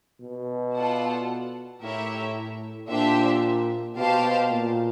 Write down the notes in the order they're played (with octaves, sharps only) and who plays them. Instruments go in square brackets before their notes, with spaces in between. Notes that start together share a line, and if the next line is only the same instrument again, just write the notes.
[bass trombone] B2
[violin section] F4 A4 D5 F#5 A5
[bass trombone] A2 [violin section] E4 G4 A#4 C#5 E5
[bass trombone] A#2 [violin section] D4 G4 C5 E5
[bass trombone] B2 [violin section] G4 C5 F5 A5
[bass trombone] A#2